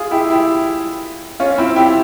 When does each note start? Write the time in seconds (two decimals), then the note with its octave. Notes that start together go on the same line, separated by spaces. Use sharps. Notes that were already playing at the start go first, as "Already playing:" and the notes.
Already playing: F4 G#4
0.11 E4 G4
0.30 E4 G4
1.40 C#4 F4
1.58 C4 E4
1.76 E4 G4